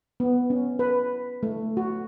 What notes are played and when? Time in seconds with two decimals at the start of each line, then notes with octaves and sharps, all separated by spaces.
0.20 B3
0.50 C#4
0.79 B4
1.43 A3
1.77 F#4